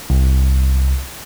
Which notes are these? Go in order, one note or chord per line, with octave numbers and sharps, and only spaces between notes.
C2